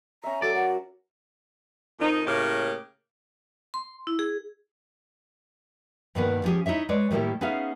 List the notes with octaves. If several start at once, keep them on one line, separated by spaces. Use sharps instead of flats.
C#4 E5 A#5
F#3 A4 D5
A#4 F#5
F2 D#3 F3 D#4
A2 C#3 A#3 G4 A#4
C6
E4
G#4
G2 B2 D#3 A#3 B3 B4
F3 C#4 D4 G4 G#4
D#4 E4 C#5 E5
G#3 B4 C#5 D5
A2 D#3 G3 A#3 E4 G4
B3 C#4 D#4 G#4 E5 F5